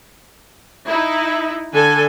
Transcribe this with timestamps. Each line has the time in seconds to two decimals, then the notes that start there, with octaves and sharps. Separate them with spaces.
0.87 D#4 E4
1.73 D3 A4 G#5